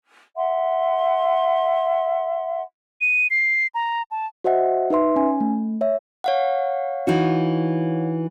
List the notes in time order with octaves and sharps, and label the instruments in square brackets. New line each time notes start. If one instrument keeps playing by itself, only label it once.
[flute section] E5 F#5 C6
[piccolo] D#7
C7
A#5
A5
[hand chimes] F#4 C5 D#5 E5 F#5
D#4 B4 E5 C6
C#4 G#5
A3
C#5 E5
C#5 F5 F#5
[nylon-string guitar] E3 D#4 F#4